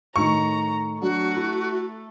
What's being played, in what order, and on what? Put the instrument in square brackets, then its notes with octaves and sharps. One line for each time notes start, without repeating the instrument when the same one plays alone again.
[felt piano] A2 D#3 [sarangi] A#5 [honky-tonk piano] C#6
[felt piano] F#3 D4 [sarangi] A3 [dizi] F#4
[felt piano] E4